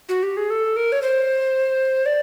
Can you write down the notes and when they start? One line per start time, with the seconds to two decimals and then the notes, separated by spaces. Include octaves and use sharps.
0.09 F#4
0.23 G4
0.37 G#4
0.50 A4
0.76 A#4
0.92 C#5
1.02 C5
2.06 D5